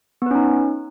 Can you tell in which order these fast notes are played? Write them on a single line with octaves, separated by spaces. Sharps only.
B3 B4 C#4 D#4